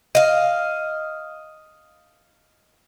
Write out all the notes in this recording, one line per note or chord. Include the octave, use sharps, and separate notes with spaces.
D#5 F5